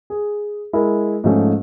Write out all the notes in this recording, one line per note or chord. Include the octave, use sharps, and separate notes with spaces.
G#4
G#3 E4 A#4
G#2 F3 A3 C#4